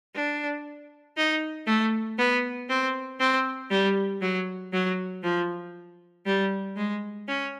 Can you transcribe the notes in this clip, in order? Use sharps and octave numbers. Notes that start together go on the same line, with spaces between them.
D4
D#4
A3
B3
C4
C4
G3
F#3
F#3
F3
G3
G#3
C#4